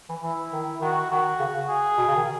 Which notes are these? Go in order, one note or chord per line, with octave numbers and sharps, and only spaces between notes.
E3
E3 E4
D#3
D#3 F#4
D#3 F#4
C#3
C#3
G#4
B2
C#3
D#3